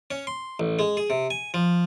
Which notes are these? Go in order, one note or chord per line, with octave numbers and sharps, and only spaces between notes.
C#4
C6
A1
G#3
G#4
C3
G#5
F3